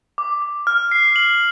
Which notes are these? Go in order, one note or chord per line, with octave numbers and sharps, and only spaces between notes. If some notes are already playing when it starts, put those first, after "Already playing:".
D6
D6
F6
C7
F#7